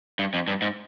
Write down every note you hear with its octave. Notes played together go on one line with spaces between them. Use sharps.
G2
F2
G2
G#2